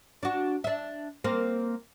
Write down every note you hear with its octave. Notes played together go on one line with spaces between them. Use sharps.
D4 F#4
D4 E5
A#3 C4